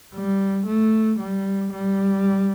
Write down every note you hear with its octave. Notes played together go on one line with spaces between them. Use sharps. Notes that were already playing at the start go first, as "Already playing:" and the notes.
G3
A3
G3
G3